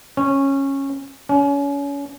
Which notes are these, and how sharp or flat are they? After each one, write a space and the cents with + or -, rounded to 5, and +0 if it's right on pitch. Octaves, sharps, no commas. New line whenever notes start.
C#4 -15
C#4 +30